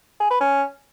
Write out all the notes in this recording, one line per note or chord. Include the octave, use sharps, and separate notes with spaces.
G#4
B4
C#4